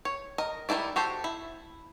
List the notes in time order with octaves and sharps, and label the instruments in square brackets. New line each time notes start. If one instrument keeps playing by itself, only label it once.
[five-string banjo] C#5
A#4 D#5
D#3 G3 C#4 E4 D5
F#4 G4 A4 C5
E4